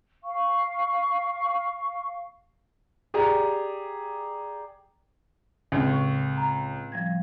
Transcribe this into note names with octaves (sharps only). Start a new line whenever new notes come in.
F5 C#6
G4 G#4 D5 A#5
C#2 A2 C#3 C4
C#6
A#5
F3 G3 G#6